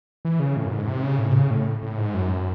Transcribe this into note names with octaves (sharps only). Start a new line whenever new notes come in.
E3
C#3
A2
F#2
G#2
C3
C#3
A2
C3
C#3
A2
A2
G#2
F#2